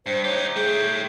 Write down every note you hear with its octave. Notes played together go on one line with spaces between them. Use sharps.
G2 C5
D#4 G4 C#5
A3 G#4 G5